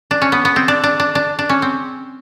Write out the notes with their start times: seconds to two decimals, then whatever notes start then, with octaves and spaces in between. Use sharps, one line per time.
0.11 D4
0.22 C#4
0.32 B3
0.45 B3
0.56 C4
0.68 D4
0.84 D4
1.00 D4
1.15 D4
1.39 D4
1.49 C#4
1.62 C4